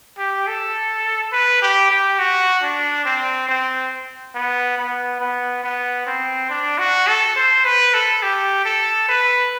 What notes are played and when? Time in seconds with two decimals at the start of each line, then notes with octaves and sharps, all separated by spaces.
0.18 G4
0.47 A4
1.33 B4
1.62 G4
1.91 G4
2.19 F#4
2.63 D4
3.05 C4
3.49 C4
4.35 B3
4.78 B3
5.20 B3
5.64 B3
6.07 C4
6.50 D4
6.79 F#4
7.07 A4
7.36 C5
7.65 B4
7.94 A4
8.23 G4
8.65 A4
9.09 B4